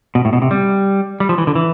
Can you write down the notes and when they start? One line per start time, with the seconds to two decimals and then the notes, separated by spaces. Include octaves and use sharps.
0.15 B2
0.25 A2
0.33 B2
0.42 C3
0.51 G3
1.20 G3
1.29 F3
1.38 E3
1.47 D3
1.55 E3